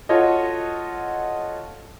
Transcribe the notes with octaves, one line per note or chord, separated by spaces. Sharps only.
F4 F#4 A4 C#5 D#5